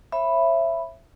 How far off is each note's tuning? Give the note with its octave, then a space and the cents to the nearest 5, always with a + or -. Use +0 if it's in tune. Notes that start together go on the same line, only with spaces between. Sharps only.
C#5 -45 E5 +15 B5 +0